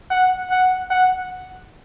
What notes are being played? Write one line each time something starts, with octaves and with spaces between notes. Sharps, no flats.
F#5
F#5
F#5